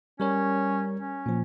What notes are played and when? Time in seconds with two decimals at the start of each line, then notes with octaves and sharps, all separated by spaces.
0.20 G3 C#4 A#4 C#5
0.99 C#4
1.26 A#2 F3